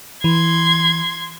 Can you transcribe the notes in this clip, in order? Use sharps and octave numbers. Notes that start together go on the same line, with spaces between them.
E3 C6 G#6